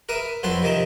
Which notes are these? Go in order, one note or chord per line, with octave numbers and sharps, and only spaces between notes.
A#4 B4 E5 D#6
F2 F#3 C4 B4 A5 C6
C3 D#3 F3 D#5 E5